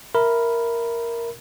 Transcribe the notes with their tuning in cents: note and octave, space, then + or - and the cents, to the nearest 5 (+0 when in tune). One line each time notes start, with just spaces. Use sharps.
A#4 +0 E5 +0 B5 +0